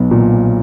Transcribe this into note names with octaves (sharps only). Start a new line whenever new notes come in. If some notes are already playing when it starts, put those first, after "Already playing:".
Already playing: B1 B3
A#2